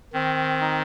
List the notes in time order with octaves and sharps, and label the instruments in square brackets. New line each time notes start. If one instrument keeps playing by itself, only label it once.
[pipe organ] D#3 [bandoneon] C4
[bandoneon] D#4